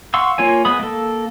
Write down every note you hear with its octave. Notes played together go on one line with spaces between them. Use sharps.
F5 F#5 C6 C#6 E6
A#3 F4 C#5 G#5
G#3 B3 B5 D#6
A#3 A4